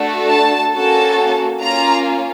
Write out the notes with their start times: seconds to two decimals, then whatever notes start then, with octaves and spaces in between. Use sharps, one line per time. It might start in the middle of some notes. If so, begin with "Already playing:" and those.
Already playing: A3 D4 F#4 A4
0.29 A5
0.73 A#3 C#4 F#4 A4 A5
1.61 A#3 C#4 F4 A#5